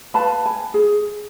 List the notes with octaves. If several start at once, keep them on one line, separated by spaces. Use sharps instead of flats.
B4 F5 A5 B5
G#5
G#4